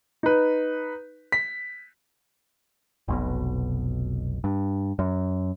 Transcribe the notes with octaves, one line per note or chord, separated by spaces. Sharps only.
D#4 B4
B6
F1 B1 B2
G2
F#2